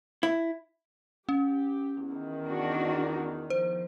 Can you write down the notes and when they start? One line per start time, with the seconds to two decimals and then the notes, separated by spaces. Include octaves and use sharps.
0.23 E4
1.29 C#4 G4
2.08 E2 D#3
2.46 D4 F#4
3.50 F3 C5